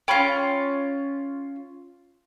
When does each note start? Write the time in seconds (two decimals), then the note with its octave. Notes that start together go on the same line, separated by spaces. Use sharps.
0.08 C#4 F4 G5 B5 F6